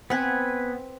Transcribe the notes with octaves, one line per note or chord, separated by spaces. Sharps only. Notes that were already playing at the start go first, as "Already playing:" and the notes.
B3 C4 B4 F#5 G#5